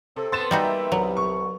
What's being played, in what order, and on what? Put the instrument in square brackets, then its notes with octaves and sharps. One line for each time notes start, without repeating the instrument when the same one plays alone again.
[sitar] C3 [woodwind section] C4 A4
[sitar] B3 [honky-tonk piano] C6 A6 E7
[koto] G3 D#4 F#4 [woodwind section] A#3 E5 G5
[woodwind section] C2 [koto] F#3
[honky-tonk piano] C#6